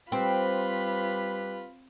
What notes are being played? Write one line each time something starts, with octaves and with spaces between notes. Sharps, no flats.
G3 C4 F4 G4 B4 B5